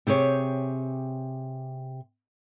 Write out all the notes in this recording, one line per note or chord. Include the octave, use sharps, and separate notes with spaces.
C3 G4 G#4 C#5